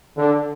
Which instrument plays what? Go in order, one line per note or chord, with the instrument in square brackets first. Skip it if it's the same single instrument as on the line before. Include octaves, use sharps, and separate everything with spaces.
[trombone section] D3